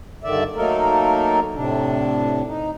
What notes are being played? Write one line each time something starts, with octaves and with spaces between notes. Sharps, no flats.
G2 D3 D#3 D5 E5
F#3 A3 A#3 D#4 A4 A#4
A2 C3 D4
D#4